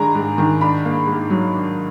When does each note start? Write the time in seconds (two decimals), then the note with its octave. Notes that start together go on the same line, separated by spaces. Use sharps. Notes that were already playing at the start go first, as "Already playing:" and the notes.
Already playing: G#2 D#3 G#3 D4 G#5 A#5 B5
0.15 G#2
0.38 D#3
0.61 D4 B5
0.85 A#3
1.07 G#2
1.30 F#3
1.54 D4